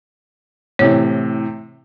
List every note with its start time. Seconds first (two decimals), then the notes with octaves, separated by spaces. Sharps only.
0.79 A2 C3 E3 C#5